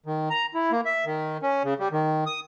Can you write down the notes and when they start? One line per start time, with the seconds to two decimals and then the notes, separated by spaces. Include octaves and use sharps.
0.06 D#3
0.30 A#5
0.54 E4
0.72 A#3
0.85 E5
1.05 D#3
1.43 C#4
1.64 C#3
1.80 G3
1.92 D#3
2.26 D#6